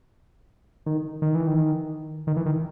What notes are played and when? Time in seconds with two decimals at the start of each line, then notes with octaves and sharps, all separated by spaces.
0.86 D#3
1.22 D#3
1.35 E3
1.47 D#3
2.27 D#3
2.37 E3
2.46 D#3